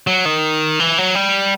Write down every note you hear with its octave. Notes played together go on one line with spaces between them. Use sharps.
F#3
D#3
E3
F#3
G3